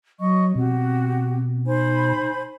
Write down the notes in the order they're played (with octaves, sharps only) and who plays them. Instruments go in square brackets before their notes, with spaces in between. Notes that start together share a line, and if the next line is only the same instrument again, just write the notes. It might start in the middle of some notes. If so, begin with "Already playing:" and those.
[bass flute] F#3 [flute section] D#5 C#6
[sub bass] B2 [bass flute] C4 [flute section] F#4 G4
[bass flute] D#4 [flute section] C5 G#5 B5